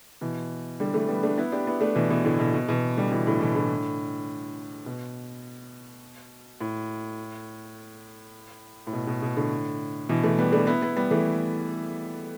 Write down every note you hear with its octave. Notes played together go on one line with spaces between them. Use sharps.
B2 E3
D3 G3
E3 A3
G3 B3
A3 D4
B3 E4
D4 G4
B3 E4
A3 D4
B2 E3
B2 E3
A2 D3
B2
B2
B2 E3
D3 G3
B2 E3
A2 D3
B2 E3
A2 D3
B2
A2
A2
B2
B2
B2
A2 D3
B2 E3
E3 A3
G3 B3
A3 D4
B3 E4
B3 E4
G3 B3
E3 A3